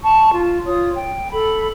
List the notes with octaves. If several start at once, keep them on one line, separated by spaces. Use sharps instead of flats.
A5 C#6
F4
F4 C#5 D#6
G5
A4 B5